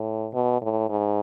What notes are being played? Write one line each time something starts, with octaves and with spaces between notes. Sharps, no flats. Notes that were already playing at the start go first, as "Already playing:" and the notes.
Already playing: A2
B2
A2
G#2